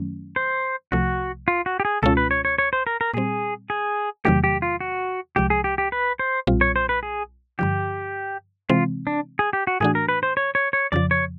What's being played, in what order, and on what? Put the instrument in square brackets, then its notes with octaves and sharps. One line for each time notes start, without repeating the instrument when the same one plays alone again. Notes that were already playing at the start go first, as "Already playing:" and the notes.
Already playing: [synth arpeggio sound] F#2 D#3 F#3 A3 C#4
[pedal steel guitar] C5
[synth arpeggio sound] C2 C3 F3 A3 [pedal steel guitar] F#4
[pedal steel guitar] F4
F#4
G4
G#4
[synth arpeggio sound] C#2 B2 G#3 C#4 F4 [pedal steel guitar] A4
[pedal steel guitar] B4
C#5
C#5
C#5
C5
A#4
A#4
[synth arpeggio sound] A#2 G3 C4 [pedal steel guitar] G#4
[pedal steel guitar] G#4
[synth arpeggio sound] E2 C3 D#3 F#3 A3 [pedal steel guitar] G4
[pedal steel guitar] G4
F4
F#4
[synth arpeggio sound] C2 C3 F3 G#3 [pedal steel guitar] G4
[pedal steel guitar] G#4
G4
G4
B4
C5
[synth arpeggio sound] B1 A#2 G3 C4 F4
[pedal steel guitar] C#5
C5
B4
G#4
[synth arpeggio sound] G2 D3 F3 [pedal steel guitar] G4
[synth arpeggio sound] C3 E3 G#3 C4 [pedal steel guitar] F4
[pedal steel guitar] D4
G#4
G4
F#4
[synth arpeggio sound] A2 E3 A3 D4 F#4 [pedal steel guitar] G#4
[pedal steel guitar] A#4
B4
C5
C#5
C#5
C#5
[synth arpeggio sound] F2 C#3 F3 [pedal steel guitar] D5
[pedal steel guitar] C#5